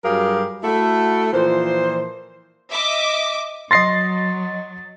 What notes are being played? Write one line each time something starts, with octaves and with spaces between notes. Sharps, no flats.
G2 F#3 G4 G#4 A#4 F5
A3 E4 F#4
A#2 E3 F3 C5
D#5 E5 D6
F#3 D#5 C6 A6 A#6 C7